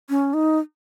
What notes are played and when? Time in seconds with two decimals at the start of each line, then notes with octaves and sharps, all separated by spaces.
0.10 C#4
0.34 D#4